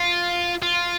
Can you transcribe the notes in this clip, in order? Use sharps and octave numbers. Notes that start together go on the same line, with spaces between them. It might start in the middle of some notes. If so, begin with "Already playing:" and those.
Already playing: F4
F4